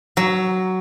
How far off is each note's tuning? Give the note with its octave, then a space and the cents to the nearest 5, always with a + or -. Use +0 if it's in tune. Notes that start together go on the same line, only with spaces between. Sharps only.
F#3 +10